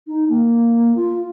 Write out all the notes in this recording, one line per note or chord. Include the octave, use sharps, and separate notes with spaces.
D#4
A#3
F4